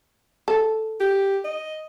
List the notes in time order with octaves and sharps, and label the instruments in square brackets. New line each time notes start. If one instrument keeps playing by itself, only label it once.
[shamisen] A4
[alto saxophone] G4
D#5